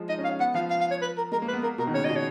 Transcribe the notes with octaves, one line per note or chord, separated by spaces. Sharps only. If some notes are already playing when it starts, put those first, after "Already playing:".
Already playing: F3 G#3
D#4 D#5
C#4
F5
C#4
B3 F#5
F3 F5
F5
F5
C#5
B4
A#4
G#3 A#4
A#3
B4
B3
A#3 A#4
B2 A#4
D#3
C#3 C#5
D#5
B2
C#5